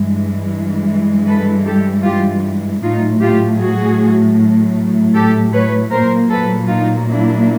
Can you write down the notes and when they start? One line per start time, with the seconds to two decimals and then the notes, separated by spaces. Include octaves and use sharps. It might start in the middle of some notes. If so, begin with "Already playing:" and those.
Already playing: G2 E3 G#3
1.27 A4 B4
1.66 G4 A4
2.05 F4 G4
2.82 A2 F#3 A3 D#4 F4
3.21 F4 G4
3.60 F#4 G#4
5.15 G4 A4
5.53 B4 C#5
5.92 A#2 F#3 A#3 A#4 C5
6.30 A4 B4
6.69 D#4 F4
7.08 D4 E4